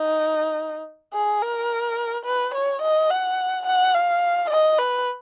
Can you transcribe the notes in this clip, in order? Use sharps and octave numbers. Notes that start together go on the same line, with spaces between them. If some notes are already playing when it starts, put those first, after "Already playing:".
Already playing: D#4
G#4
A#4
B4
C#5
D#5
F#5
F#5
F5
D#5
B4